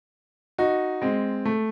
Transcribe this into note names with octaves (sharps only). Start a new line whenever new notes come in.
D#4 F#4
G#3 C4
A3